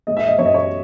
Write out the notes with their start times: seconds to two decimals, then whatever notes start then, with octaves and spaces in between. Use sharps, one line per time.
0.07 G#3 D#5
0.17 E5
0.27 D#5
0.38 F#2 C#5
0.46 D#5
0.54 C#5